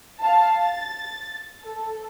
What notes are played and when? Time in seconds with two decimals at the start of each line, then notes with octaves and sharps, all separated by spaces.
0.20 F5 A5
0.61 A6
1.65 A4